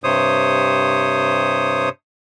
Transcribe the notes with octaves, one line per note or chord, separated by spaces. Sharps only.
G2 C3 C5 C#5 D#6